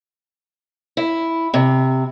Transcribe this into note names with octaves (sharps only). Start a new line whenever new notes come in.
E4
C3